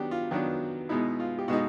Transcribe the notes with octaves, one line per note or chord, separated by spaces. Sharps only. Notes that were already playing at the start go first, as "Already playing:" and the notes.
Already playing: D#3 F#3 B3 D4 G4
F4
D#3 F#3 B3 D4
B2 G#3 B3 D#4 E4
F4
G4
B2 G#3 B3 D#4 F#4